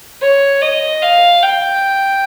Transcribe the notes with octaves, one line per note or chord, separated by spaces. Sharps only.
C#5
D#5
F5
G5